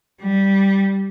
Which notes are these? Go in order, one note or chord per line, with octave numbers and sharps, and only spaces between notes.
G3